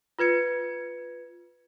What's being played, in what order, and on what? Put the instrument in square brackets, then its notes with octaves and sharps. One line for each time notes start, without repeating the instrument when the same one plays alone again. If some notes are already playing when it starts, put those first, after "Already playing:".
[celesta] F4 B4 G#6 C#7